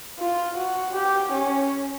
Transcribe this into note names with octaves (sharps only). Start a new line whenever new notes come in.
F4
F#4
G4
C#4